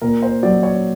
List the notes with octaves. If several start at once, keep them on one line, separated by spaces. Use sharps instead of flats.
A#2 A#4
C5
F#3 D5
C#5